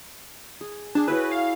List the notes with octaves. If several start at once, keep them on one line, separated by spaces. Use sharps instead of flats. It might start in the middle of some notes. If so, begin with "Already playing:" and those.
G#4
D4 G#4 A5
E4 F#4 B4 C#5
F5